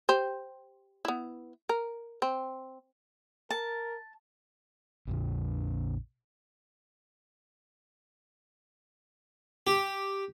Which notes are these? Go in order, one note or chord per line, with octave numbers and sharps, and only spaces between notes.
G4 C5
B3 E4
A#4
C4
A#4 A5
A#1 F2 D3
G4